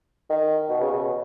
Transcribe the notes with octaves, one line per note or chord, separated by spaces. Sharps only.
D#3
B2
C#3
B2